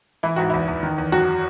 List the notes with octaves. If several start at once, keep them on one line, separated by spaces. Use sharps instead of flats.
E3 E4
G#2 F#4
E2 E4
E2
D#3
E2
F#2 F#4